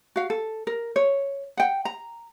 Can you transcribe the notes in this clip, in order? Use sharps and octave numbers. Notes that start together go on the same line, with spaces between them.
F#4 F5
A4
A#4
C#5
F#5 G5
A#5